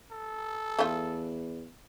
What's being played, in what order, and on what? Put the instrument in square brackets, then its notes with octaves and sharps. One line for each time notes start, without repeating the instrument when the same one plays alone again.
[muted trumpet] A4
[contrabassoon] E2 [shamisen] A3 F4